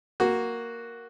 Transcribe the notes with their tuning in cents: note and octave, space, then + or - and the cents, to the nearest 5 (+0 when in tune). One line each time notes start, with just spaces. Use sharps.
A#3 +0 F#4 +0